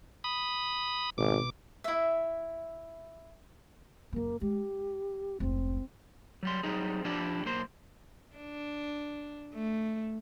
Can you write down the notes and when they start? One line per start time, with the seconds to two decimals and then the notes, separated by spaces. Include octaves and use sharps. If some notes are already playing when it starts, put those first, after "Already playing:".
0.24 B5 D#6
1.18 G#1 B2 D6
1.84 E4 E5
4.13 F#1 C#3 A#3
4.41 G#3 G4
5.40 F1 C#2 C4
6.43 F#3 G3 C6
6.63 F#3 G3 C4 D#4 G#4
7.05 F3 D4 E4 G4 D5
7.45 B1 A#3 C5 C6
8.36 D4
9.54 A3